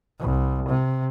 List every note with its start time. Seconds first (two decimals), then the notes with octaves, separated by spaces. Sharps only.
0.20 C2
0.68 C3